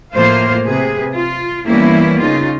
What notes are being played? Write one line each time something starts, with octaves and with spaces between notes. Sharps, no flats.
A2 F3 A#3 F4 C5 F5
C3 G#4 B4
F4
E3 G3 A#3 B3 C#4 E4
C#3 D#4 F4